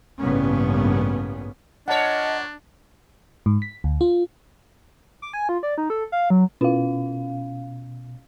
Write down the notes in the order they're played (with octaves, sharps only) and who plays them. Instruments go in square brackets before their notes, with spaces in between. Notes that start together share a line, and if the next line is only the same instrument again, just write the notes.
[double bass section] A1 G2 C#3 A#3 B3 C#4
[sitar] A#2 C#5 [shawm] D4 [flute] D#5 [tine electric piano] F#5 A5
[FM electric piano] G#2
B6
D2
F4
[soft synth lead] D6
G#5
F4
D5
D#4
A4
F5
F#3
[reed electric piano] B2 [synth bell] C#4 F5 [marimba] E4 F4 B4